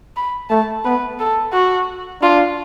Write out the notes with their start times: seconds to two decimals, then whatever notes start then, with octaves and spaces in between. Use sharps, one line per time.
0.16 B5
0.49 A3 A5
0.84 B3 B4
1.19 A4
1.53 F#4
2.22 D4 F4